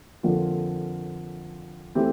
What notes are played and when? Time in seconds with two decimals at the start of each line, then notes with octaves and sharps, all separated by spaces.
0.23 F2 D3 F3 A#3 F4
1.95 E3 A3 C4 E4 G4